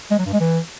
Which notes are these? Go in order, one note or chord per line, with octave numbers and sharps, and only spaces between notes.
G#3
F#3
G2
G#3
E3